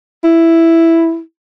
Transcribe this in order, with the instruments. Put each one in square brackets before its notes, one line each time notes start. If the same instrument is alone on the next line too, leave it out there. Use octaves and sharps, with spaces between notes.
[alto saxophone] E4